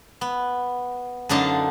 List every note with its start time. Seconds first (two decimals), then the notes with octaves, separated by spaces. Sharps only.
0.21 B3
1.29 F#2 D3 D4 D#4 F5 A5